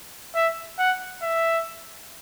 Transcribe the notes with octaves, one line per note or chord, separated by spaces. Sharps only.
E5
F#5
E5